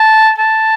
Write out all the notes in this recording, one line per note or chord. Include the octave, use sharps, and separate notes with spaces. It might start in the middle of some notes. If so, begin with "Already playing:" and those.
Already playing: A5
A5